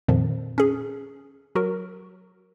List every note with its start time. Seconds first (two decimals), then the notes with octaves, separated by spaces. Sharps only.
0.08 F2 A#2 D#3 F3
0.58 C#4 G#4
1.55 F#3 F#4 A#4